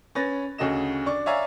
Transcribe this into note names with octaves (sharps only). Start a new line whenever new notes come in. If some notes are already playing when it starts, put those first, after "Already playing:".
C#4 B4 A6 A#6
D2 C#3 F#4 A4 D#5 E7
D4 D5 C#6
C#5 D5 E5 F5 G#5 A#5